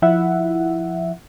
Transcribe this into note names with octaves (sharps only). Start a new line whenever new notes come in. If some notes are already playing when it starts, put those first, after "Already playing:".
F3 E4 E5 F#5